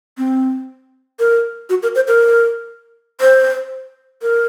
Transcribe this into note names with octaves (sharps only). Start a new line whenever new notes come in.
C4
A#4
F#4
A#4
C5
A#4
C5
A#4